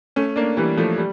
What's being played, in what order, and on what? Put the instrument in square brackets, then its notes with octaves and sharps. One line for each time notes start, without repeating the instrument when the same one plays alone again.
[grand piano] A3 C#4
A#3 D4
E3 G3
F3 A3
G3